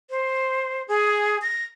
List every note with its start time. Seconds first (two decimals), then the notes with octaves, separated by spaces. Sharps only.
0.10 C5
0.88 G#4
1.42 A#6